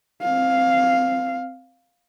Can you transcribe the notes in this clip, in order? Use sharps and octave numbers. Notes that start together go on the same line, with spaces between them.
C4 F5